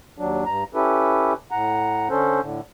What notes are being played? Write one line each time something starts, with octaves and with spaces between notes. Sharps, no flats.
D#2 F#3 D4
G2 A#5
C#4 E4 G4 A4 B4
A2 F#5 A#5
D3 C#4 A4 C5
A2 D3